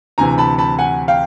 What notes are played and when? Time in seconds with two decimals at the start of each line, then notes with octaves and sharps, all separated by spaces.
0.18 D2 C3 E3 G#5 A#5
0.38 A5 B5
0.58 A5 B5
0.79 F#5 G#5
1.08 F5 G5